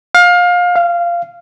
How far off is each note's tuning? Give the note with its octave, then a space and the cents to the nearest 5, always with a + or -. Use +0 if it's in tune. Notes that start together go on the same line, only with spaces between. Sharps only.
F5 +25
F5 -15